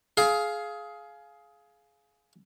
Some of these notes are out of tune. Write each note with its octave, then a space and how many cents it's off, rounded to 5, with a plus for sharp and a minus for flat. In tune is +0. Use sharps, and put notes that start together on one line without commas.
G#4 +20 F5 +0